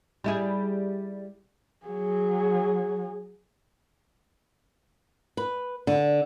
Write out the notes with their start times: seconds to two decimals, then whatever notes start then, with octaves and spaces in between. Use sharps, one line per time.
0.24 G3 E4 G#4
1.86 F#3 G#4
5.37 B4
5.87 D3